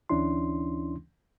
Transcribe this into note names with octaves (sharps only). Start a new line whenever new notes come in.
D2 E3 C#4 D4 E4 C6